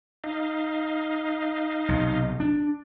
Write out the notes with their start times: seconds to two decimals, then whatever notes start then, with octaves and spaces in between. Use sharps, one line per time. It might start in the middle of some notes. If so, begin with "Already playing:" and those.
0.24 D#4 D#5 F5
1.89 B1 C3
2.40 D4